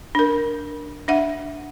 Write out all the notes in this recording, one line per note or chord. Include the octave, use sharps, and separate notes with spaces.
D4 A#4
D4 E5 F#5